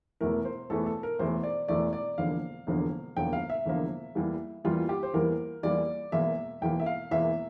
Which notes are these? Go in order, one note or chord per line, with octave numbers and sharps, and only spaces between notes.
E1 E2 E3 A3 A#4
C5
E1 E2 E3 A3 A4
A4
A#4
E1 E2 E3 A3 C5
D5
E1 E2 E3 A3 D5
D5
E1 E2 D3 F3 A#3 F5
E1 E2 D3 F3 A#3
E1 E2 D3 F3 A#3 G5
F5
E5
E1 E2 D3 F3 A#3
E2 E3 G3 A#3
E2 E3 G3 A#3 F4
G4
C5
E2 E3 G3 A#3 A#4
E2 E3 G3 A#3 D5
E1 E2 E3 A#3 E5
E1 E2 E3 A#3 G5
E5
F5
E1 E2 E3 A#3 E5